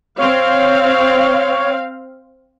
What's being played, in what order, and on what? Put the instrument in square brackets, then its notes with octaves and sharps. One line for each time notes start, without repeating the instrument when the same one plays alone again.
[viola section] C4 F5 [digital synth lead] C#5